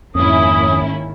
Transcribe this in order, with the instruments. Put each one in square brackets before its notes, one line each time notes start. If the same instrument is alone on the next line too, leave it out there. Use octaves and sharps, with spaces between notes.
[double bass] G#1 D#3 [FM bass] F2 [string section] A#3 C#4 E4 [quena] D#6